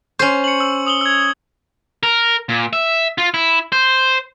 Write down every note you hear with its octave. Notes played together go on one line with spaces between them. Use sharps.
C#4 C5 C#6
C#7 F#7
E6
D#6 F#7 G7
E6 G#6
A#4
A#2
E5
F4
E4
C5